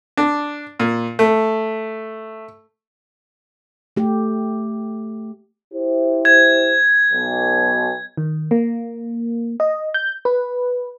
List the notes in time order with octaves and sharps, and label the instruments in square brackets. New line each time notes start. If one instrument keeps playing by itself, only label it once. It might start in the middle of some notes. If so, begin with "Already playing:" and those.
[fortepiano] D4
A#2
A3
[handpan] A3 G4
[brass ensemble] E4 G4 C5
[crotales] G#6
[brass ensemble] B1
[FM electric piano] D#3
A#3
D#5
G6
B4